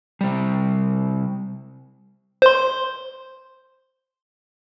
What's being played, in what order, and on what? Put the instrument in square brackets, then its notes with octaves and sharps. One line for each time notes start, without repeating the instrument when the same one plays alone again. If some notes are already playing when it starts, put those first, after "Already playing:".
[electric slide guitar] C3 G3
[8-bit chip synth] C5 C6